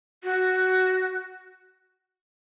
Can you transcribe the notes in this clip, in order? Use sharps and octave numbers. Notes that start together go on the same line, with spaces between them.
F#4